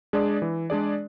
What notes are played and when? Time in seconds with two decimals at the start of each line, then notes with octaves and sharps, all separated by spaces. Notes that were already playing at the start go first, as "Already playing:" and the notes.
0.13 G#3 D4 G#4 D5
0.42 E3
0.70 G#3 D4 G#4 D5